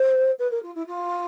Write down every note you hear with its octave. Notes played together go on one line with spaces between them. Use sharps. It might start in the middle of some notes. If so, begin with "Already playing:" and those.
Already playing: C5
B4
A#4
F4
E4
F4